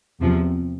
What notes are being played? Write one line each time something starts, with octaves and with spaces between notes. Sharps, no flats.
E2 C3 F3